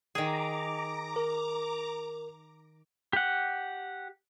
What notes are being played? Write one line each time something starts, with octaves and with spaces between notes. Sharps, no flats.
D#3 G#4 A#5 D6
A#4
G4 F#5